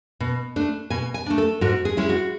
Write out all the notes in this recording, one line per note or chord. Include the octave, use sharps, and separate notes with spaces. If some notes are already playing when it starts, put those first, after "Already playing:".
B2
A3 D4
B2 G#5
G#5
A3 D4
A4
G#2 F#4
G#4
G#3 C#4 E4
F#4